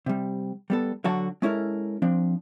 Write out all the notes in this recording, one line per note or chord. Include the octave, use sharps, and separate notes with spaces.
C3 G3
G3 B3 A4
D3 F#3 F#4 A5
G#3 C#4 E4 A4 A#4
F3 C4 D4